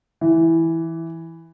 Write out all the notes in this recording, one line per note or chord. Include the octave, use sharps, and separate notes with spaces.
E3